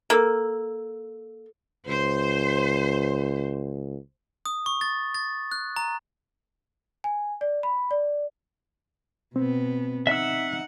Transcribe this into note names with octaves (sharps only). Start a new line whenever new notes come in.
A#3 A4 E6
C#2 C5
D#6
C#6
A6
A6
F#6
A#5
G#5
D5
B5
D5
B2 B3 C4
D#4 E5 F#5 E6